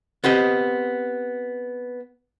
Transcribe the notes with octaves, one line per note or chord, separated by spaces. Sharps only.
B3 C4 G4 D#5